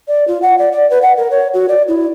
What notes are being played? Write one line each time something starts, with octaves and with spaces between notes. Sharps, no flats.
D5
F4
F#5
D5
D5
B4
F#5
A#4
C#5
F#4
D5
E4